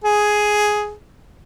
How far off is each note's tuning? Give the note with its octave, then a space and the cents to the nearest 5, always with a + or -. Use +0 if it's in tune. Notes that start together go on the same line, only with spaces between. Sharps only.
G#4 +5